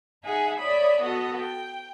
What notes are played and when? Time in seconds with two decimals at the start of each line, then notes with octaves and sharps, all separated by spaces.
0.24 D#4 G#4 E5 F#5 G#5
0.60 C#5 D5 E5 B5 D#6
1.01 B3 F#4 A4 D#5
1.39 G5